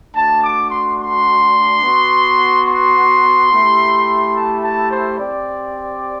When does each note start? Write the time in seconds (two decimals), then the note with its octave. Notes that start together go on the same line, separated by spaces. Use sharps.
0.14 A3 D4 F#4 A5
0.42 D6
0.70 C6
0.99 C6
1.83 B3 F#4
2.67 C6
3.51 A3 E4 G4
4.34 A5
4.63 A5
4.90 C5
5.18 C4 G4 D5